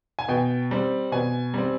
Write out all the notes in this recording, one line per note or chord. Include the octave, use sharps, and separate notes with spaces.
G#5
B2 G5
G3 C4
B2 G#5
G3 C4